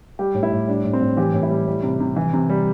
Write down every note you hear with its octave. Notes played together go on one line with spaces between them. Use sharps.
G3 G4
A2
E4
A2
G3 D4
A2
C4
A2
E3 G4
A2
E4
G3
G3
C3
C3
E3
C3
G3